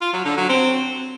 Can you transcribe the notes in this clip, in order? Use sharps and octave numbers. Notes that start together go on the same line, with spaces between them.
F4
F#3
D3
F#3
C4